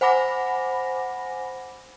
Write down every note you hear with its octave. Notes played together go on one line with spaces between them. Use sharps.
C5 F#5 G#5 B5 D6 A#6